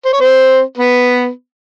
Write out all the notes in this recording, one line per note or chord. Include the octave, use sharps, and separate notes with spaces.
C5
C#5
C4 C5
B3 B4